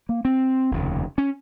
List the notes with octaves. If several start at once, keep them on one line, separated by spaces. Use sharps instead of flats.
A#3
C4
F1 D#2 C#3
C#4